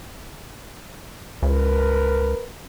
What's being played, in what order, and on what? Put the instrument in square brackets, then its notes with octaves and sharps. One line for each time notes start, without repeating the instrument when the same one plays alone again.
[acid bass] C#2 [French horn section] A#4 B4